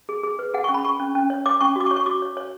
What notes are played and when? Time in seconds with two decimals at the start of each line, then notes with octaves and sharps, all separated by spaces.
0.09 G#4
0.23 G#4
0.39 B4
0.54 G#4 F#5
0.64 C#4 C#6
0.74 B5
0.84 G#4 C#6
1.00 C#4
1.15 C#4
1.30 C#5
1.46 C#5 D6
1.61 C#4 C#6
1.76 F#4 D6
1.86 C#6
1.91 C#5
1.96 C#6
2.06 F#4 D6
2.22 C#5
2.37 C#5